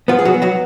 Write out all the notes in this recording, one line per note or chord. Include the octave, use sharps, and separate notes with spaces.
F3 B3 F4
G#4
F#3 F#4
B3
F#3 F#4